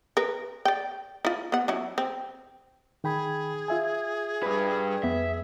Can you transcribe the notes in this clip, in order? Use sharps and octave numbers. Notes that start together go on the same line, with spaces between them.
A#4 B4
D5 G5
E4 F4
B3 F#5
F#3 C#4 E4
C4
D#3 G#4 G5 B5
F4 E5 G#5
G2 B4
F2 B3 E5